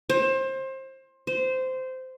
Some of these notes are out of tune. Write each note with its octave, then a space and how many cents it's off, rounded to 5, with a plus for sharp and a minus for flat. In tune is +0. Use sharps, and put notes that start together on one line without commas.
C5 +25
C5 -15